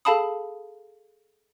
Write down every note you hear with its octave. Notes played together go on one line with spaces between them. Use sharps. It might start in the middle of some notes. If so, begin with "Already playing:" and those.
G#4 A4 F5 A5 B5 D#6